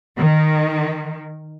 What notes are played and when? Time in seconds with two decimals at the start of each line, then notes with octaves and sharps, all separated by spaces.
0.17 D#3